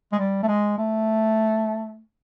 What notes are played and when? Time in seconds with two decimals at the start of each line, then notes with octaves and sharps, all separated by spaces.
0.12 G#3
0.19 G3
0.43 A3
0.48 G#3
0.78 A3